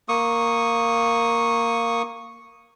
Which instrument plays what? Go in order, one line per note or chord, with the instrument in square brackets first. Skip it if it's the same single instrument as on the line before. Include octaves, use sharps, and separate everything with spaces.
[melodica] A#3 C#6 D#6